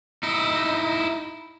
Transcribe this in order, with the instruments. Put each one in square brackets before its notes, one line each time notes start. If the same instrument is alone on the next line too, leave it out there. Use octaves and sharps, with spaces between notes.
[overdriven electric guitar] D#4 E4